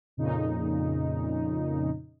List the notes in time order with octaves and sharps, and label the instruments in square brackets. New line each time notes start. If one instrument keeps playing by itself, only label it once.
[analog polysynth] F2 A#2 C#3 D#4